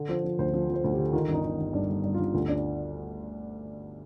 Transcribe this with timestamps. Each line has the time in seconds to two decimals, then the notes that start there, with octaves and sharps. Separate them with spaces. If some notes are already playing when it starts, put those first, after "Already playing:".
Already playing: D3
0.09 F3 C5
0.24 F3
0.39 D2 C5
0.53 F3
0.69 F3 C5
0.84 D2
0.93 G4
0.99 D3
1.13 D#3 F4
1.28 G1
1.34 D#4
1.43 D#3
1.59 G1
1.73 G2 D4
1.89 G1
2.04 G2
2.14 F4
2.19 G1
2.33 D2 F4
2.48 D4